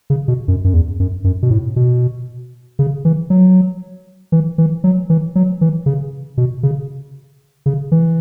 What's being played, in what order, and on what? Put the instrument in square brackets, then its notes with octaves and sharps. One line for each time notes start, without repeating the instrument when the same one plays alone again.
[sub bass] C#3
B2
F#2
F#2
E2
F#2
F#2
B2
A2
B2
C#3
E3
F#3
E3
E3
F#3
E3
F#3
E3
C#3
B2
C#3
C#3
E3